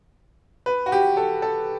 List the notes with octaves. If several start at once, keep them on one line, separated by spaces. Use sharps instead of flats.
B4
F#4
G4
A4
A4